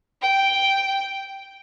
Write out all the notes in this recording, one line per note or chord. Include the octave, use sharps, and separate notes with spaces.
G5